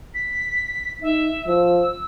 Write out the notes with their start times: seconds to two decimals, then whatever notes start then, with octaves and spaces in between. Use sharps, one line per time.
0.14 B6
1.02 D#4 E5
1.47 F3 E6